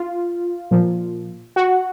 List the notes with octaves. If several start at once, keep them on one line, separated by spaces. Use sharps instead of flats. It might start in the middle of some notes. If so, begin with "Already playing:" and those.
Already playing: F4
A#2 F3
F#4